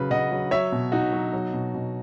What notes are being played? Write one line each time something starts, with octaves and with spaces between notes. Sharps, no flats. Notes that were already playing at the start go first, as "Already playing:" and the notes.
Already playing: C#3 F#3 B4
C#3 D#5 F#5
F#3
F#3 C#5 E5
B2
B2 D#4 F#4
F#3
F#3
B2
B2